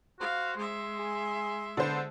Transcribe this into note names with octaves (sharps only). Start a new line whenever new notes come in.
F#4 C5 F5
G#3 E5 C6
G#4
D3 B3 C5